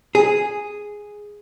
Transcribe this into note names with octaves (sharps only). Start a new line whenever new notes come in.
G#4